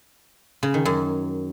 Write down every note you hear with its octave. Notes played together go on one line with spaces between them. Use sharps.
C#3
D#3
F#2